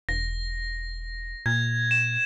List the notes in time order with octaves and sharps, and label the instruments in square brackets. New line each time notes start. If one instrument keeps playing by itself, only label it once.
[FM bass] E1 [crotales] A#6
[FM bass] A#2 [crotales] G#6
[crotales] E7